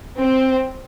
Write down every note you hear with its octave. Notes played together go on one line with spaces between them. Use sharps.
C4